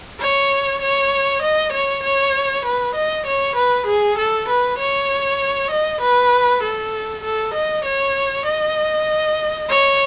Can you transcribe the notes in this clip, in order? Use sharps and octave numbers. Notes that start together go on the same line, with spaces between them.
C#5
C#5
D#5
C#5
C#5
B4
D#5
C#5
B4
G#4
A4
B4
C#5
D#5
B4
A4
A4
D#5
C#5
D#5
C#5